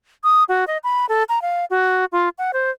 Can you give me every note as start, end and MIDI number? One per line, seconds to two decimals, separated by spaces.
0.24 0.44 87
0.49 0.65 66
0.67 0.78 75
0.84 1.06 83
1.09 1.23 69
1.29 1.41 82
1.42 1.65 77
1.70 2.05 66
2.12 2.29 65
2.38 2.51 78
2.53 2.71 72